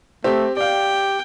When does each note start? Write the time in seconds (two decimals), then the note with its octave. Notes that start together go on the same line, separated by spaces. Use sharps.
0.24 A3 C4 G4
0.57 G4 D5 F5 G5